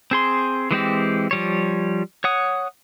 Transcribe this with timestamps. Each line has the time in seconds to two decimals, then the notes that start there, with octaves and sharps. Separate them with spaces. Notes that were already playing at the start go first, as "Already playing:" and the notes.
0.11 C4 G#4 C6
0.71 E3 G#3 C4 G4
1.31 F3 G3 C#5
2.24 C#5 F#5 D#6